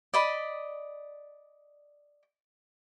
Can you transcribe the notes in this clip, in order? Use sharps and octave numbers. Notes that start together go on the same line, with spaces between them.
D5 D#5 B5